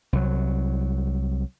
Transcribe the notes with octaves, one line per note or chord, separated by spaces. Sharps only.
C2 F#3